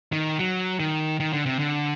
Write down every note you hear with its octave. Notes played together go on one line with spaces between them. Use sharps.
D#3
F#3
D#3
D#3
D3
C3
D3